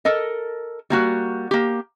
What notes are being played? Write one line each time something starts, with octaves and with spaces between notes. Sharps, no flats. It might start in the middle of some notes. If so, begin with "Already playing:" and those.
A4 A#4 D#5
G3 A#3 F#4
A#3 G4